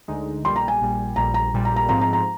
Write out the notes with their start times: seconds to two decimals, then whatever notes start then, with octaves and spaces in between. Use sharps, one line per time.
0.08 D2 D3 G#3 D#4
0.44 A#1 A#2 G3 C6
0.56 A#5
0.68 G#5
0.81 A#1 A#2 G3
1.16 A#1 A#2 G3 A#5
1.34 A#5
1.53 A#1 A#2 G3
1.65 A#5
1.76 A#5
1.89 G#2 F3 C4 A#5
2.01 A#5
2.13 A#5